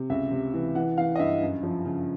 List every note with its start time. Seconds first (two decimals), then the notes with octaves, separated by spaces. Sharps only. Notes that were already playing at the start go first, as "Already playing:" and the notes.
Already playing: C3
0.10 C#2 E5
0.31 C3
0.54 E3
0.75 E3 F#5
0.98 E3 F5
1.15 D#5
1.19 G2 E5
1.42 F#2
1.63 F3
1.85 C#3